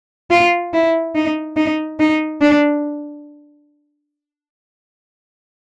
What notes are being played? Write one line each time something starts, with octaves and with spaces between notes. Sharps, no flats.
F4
E4
D#4
D#4
D#4
D4